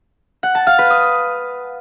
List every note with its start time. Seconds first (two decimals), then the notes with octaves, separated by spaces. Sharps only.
0.43 F#5
0.55 A5
0.67 F5
0.79 B4
0.90 D#6